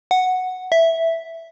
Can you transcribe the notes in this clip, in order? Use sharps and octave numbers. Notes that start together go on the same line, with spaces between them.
F#5
E5